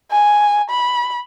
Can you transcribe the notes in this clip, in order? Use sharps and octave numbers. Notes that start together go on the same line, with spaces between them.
G#5
B5